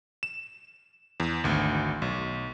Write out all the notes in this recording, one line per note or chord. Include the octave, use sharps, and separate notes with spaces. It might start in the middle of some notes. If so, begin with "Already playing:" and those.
E7
E2
G#1 D2
B1